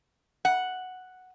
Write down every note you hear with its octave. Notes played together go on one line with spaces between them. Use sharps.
F#5